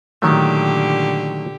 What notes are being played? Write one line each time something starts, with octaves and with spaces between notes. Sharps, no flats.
A#2 D3 D#3 F#3 A3 G4